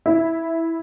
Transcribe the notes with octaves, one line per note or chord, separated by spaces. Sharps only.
E4